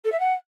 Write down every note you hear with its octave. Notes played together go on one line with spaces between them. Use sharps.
A4
E5
F#5